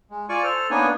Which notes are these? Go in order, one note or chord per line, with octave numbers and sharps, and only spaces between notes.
G#3
F4 D5 G#5 C#6
A4 C5 F6
A#3 B3 D4 D#4 C#5 G#5